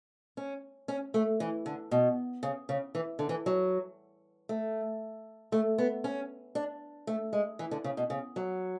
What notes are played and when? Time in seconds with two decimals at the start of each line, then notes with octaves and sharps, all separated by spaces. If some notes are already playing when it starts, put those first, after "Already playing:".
0.37 C#4
0.88 C#4
1.14 A3
1.40 E3
1.66 D3
1.91 B2
2.43 C#3
2.69 C#3
2.95 E3
3.19 D3
3.29 E3
3.46 F#3
4.49 A3
5.52 A3
5.78 B3
6.04 C#4
6.55 D4
7.07 A3
7.33 G#3
7.59 E3
7.71 D3
7.84 C#3
7.97 B2
8.10 C#3
8.36 F#3